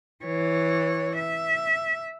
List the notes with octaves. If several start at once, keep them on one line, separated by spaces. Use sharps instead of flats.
E3 C#5
E5